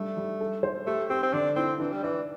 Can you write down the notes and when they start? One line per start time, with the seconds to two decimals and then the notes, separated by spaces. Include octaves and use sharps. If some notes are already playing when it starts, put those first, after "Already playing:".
Already playing: G3 A3 D4
0.17 G3
0.40 A4
0.63 C5
0.87 A3 G4
1.09 C4 G4
1.23 C4
1.33 D3 D4
1.56 C4 E4
1.80 E3 D4
1.92 G3
2.03 E3 D5